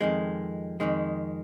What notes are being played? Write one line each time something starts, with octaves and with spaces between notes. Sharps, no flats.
F2 D#3 G#3
F2 D#3 G#3